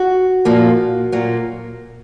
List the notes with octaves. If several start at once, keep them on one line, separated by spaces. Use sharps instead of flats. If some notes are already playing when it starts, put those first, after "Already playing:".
Already playing: F#4
A#2 F3 A#3
A#2 F#3 A#3